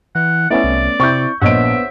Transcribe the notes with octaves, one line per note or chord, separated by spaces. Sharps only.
E3 F#5
A3 B3 C#4 E4 D5 E5
C2
C3 C4 E4 C#6 G6
A#1 B3 C5 C#5 D#5 E5 F#5 D7